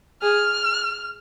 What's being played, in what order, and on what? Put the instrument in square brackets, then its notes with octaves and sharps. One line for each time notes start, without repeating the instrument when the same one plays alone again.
[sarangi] G#4 [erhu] F6